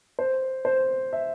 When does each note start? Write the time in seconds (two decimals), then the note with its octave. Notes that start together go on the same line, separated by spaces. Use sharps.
0.19 C5
0.65 C5
1.13 E5